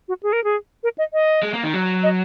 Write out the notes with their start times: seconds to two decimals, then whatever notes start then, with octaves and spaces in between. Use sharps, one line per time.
0.08 F#4
0.23 G#4
0.32 A#4
0.44 G#4
0.83 A#4
0.98 D#5
1.13 D#5
1.43 G#3
1.54 A#3
1.63 D#3
1.74 F#3
2.03 D#5